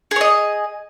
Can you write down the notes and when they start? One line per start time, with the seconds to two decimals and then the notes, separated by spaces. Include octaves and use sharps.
0.11 G#4
0.16 C#5
0.21 D#5